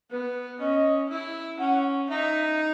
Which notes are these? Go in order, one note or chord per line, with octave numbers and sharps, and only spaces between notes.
B3 B4
C#4 D#5
E4
C#4 F#5
D#4 E5